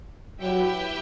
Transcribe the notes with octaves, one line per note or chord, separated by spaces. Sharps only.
F#3 E4 G4 B4 E5 G5